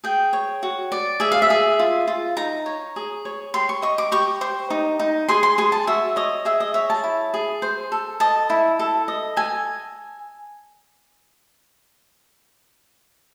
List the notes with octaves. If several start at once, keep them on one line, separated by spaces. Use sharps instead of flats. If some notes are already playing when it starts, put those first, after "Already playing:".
G#4 G5
C#5
F#4
D5
G#4 E5
F5
E5
G#4
F4
F4
D#4 A#5
C#5
G#4
C#5
G4 C6
C#6
D#5 C#6
D6
G4 C#6
C5
D#4
D#4
G#4 C6
C6
G#4 C6
A5
F#4 E5
C#5 D#5
G#4 E5
D#5
C#5 E5
A5
E4
G#4
C5
A4
D#5 A5
E4
A4
D#5
A4 G#5